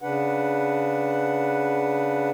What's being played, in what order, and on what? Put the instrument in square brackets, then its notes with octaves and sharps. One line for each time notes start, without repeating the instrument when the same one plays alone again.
[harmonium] C#3 D4 B4 F#5